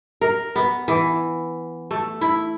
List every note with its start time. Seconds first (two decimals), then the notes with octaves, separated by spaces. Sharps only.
0.21 A#4
0.56 B3
0.88 E3
1.91 A3
2.21 E4